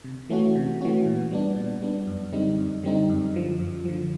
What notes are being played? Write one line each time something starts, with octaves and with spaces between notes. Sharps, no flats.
C3
E3 A3 C#4 F#4
C3
E3 A3 C#4 F#4
A#2
G3 B3 D4
A#2
G3 B3 D4
F#2
D3 G3 C4 D#4
F#2
D3 G3 C4 D#4
F#2
D3 F3
F#2
D3 F3